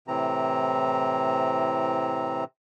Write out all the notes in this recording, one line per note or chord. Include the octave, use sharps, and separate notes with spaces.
A2 C3 E3 C4 A#5